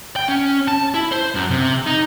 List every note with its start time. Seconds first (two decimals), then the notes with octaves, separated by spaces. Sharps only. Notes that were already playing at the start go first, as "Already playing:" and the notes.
0.16 G5
0.29 C#4
0.68 A5
0.94 E4
1.12 C5
1.35 F#2
1.50 C3
1.86 D#4